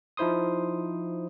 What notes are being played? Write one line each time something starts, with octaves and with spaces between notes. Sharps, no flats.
F3 D#4 E4 C5 C6 D#6